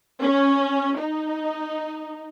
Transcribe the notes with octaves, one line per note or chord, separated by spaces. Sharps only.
C#4
D#4